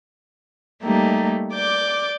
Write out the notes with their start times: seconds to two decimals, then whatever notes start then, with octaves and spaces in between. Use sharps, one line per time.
0.82 G3 A3 A#3 D#4 G4
1.53 D5 D6 G6